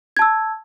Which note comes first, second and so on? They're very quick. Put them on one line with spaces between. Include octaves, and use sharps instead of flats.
G#6 A5 E6